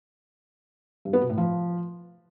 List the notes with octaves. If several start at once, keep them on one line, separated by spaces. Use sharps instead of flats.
G2
B3
B2
A2
F3